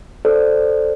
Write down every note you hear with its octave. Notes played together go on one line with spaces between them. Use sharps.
A4 C5 D5